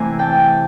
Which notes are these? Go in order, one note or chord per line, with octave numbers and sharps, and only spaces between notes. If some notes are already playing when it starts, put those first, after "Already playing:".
Already playing: C3 E3 A3 G#5 A#5 C6
G5 A5